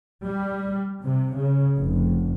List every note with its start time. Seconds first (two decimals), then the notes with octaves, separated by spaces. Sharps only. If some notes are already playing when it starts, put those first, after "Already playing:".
0.25 G3
1.03 C3
1.37 C#3
1.80 F1